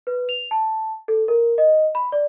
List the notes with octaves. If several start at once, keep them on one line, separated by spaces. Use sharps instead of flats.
B4
F7
A5
A4
A#4
D#5
B5
D5